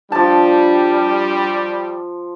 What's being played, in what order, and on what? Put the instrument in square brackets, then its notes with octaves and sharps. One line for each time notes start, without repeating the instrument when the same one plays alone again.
[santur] F3 A5 [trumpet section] G3 [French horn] D4